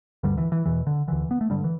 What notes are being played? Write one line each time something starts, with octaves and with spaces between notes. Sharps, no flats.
D2 G2 D3 G3
E3
E3
E2 B2 E3
D3
D2 D3 E3
B3
A3
G2 D3 G3
E3